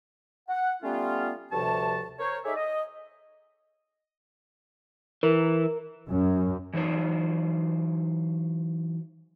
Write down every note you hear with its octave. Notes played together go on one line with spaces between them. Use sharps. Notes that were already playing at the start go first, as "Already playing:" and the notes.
F#5
G3 A3 B3 C#4 F4
D2 G2 C3 F3 C#5 A5
A#4 C5 C#5
D#4 G#4 A4 C#5 D5 E5
D#5
E3 A#4
F#2
E3 F#3 D#4 A#4 C5 D5